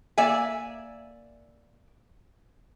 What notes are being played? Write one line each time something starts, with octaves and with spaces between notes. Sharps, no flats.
A#3 D5 E5 G#5